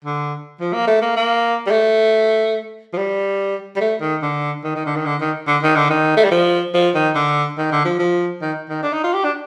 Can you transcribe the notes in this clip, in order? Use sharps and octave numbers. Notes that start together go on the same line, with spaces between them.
D3
F3
A#3
A3
A#3
A#3
G3
A3
F3
G3
G3
A3
D#3
D3
D#3
D#3
D3
D#3
D3
D#3
D3
D#3
D3
D#3
A3
G3
F3
F3
D#3
D3
D#3
D3
F3
F3
D#3
D#3
D4
D#4
F4
G4
D4